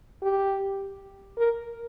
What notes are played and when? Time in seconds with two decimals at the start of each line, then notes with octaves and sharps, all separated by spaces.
0.23 G4
1.37 A#4